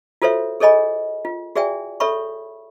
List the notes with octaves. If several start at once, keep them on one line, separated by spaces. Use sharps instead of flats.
F4 F#4 A4 C5 C#5 E5
G#4 A4 C#5 D#5 G#5 B5
F4
F#4 G#4 D5 E5 G5 G#5
A4 C#5 E5 B5 C#6